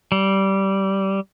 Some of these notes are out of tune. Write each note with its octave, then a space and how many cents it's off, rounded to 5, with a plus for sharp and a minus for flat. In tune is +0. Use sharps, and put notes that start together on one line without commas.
G3 -15